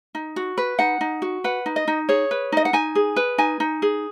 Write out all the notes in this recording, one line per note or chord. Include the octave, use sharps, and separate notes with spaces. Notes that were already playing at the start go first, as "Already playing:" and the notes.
D#4
F#4
B4
D#4 F#5
D#4
F#4
B4 F#5
D#4
D#5
D#4
G#4 C#5
B4
D#4 D#5
F#5
D#4 G#5
G#4
B4
D#4 G#5
D#4
G#4